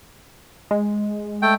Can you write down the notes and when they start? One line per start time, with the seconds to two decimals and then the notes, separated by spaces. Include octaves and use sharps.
0.71 G#3
1.42 A3 G5